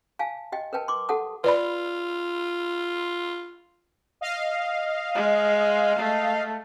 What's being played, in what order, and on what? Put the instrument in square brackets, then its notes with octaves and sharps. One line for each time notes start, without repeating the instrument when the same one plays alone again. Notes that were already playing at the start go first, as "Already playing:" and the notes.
[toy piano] F5 G#5 A5
G4 D#5 G5
A#4 B4 G5 A5
C6 D6
G4 A4 F#5 A5 D#6
[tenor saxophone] F4 [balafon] B4 D5 B5
[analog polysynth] D#5 F5
[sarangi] G#3
A3